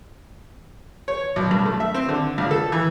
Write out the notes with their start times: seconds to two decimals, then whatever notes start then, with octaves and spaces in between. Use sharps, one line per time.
1.08 C#5
1.36 B1
1.51 G2
1.65 A3
1.80 E5
1.94 C4
2.09 D3
2.38 C#2
2.51 A4
2.72 E3